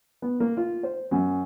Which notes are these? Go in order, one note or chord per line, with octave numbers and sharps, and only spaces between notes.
B3
A#3
F4
C5
F#2